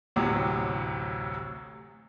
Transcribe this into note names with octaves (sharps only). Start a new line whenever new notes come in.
A1 D2 A2 C3 F#3